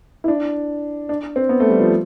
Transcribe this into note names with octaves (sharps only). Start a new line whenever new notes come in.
E4
D4
D4
C4
B3
A3
G3
F3